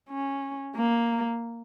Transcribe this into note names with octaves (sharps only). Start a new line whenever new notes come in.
C#4
A#3